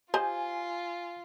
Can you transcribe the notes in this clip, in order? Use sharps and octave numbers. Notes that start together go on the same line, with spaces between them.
F4 G4 C5 D#5 G#5